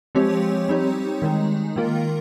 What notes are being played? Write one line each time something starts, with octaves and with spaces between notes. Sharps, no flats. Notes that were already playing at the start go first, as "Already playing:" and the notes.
F3 G#3 C4 G4 C#5
G3 C4 D#4 G4 C#5
D#3 G#3 D#4
D#3 A#3 F4 A#4